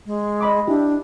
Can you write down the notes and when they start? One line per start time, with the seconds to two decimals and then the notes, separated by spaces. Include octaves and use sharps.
0.06 G#3
0.40 D#5 B5 D6
0.67 D4 E4 G4